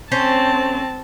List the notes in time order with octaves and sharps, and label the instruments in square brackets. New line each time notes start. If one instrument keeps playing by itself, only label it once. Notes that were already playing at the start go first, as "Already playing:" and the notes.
[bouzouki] A3 C#4 C5 [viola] C4 A5